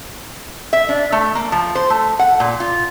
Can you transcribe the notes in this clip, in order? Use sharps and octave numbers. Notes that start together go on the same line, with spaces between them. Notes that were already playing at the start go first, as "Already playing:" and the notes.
E5
D4
A3
A#3
F3
C5
A3
F#5
A#2
F4